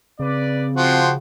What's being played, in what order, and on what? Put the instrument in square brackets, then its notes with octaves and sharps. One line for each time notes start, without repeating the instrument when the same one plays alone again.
[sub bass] C#3 [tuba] C4 [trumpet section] B4 D5
[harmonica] F3 F#4 [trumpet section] G5 C6